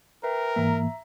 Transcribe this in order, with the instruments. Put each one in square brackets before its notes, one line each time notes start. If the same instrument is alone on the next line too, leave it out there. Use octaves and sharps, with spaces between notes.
[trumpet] A#4 [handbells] B4 E5 G5
[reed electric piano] G#2 E3 A#3 [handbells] E5 A#5